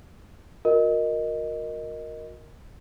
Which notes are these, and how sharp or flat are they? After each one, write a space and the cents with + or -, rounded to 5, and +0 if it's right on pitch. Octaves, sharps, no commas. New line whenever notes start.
F#4 -40 A#4 +0 D#5 +0